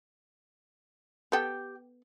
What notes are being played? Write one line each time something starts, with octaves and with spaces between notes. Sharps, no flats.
B3 G4 A4 G5